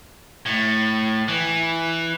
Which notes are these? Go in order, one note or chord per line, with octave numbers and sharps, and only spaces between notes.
A2
E3